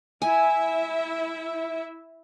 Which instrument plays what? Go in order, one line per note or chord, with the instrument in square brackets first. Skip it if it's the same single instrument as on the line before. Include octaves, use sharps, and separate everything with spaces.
[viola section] E4 E5 [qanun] G#5